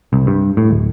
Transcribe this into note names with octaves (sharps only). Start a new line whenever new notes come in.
C2
G2
A2
D1